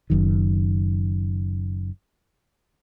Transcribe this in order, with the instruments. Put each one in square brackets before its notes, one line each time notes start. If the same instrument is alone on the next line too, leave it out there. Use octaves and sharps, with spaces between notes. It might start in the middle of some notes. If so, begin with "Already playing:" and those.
[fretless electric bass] F#1 F#2 D#3